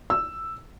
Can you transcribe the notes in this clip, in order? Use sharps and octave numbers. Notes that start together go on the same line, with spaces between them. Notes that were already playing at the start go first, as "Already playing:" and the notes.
E6